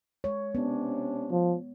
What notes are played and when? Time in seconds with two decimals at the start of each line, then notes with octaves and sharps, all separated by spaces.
0.24 G#3 C#5
0.55 C3 B3 C#4 D4
1.31 F3